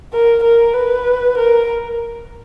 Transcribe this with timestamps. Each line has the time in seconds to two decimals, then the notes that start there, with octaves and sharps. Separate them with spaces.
0.13 A#4
0.44 A#4
0.75 B4
1.38 A#4